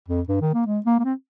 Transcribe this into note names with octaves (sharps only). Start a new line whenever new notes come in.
F2
G2
D#3
A#3
G#3
A#3
A#3
C4